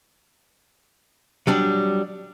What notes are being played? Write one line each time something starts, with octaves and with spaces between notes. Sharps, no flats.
F#3 G3 D4